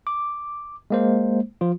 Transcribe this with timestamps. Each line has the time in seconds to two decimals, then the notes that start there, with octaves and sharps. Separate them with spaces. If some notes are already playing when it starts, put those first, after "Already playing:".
0.07 D6
0.90 G#3 A#3 C5
1.61 F3 F4